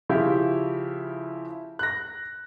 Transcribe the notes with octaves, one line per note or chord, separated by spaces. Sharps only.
C#3 F3 E4 G4
F#6 A#6